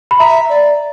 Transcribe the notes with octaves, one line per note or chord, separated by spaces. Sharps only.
B5
E5 A#5
D5